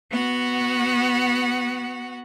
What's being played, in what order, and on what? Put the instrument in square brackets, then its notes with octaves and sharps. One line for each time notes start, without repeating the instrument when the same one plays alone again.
[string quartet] B3 F#4 F#5